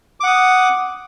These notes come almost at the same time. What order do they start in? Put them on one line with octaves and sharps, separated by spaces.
D6 F#5 D#6